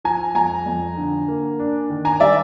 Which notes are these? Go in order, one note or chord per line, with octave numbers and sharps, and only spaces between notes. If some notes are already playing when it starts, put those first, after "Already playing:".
F3 G#5 A#5
F2 G#5 A#5
F2
D3
A#3
D4
D#3
G#5 A#5
G3 D5 E5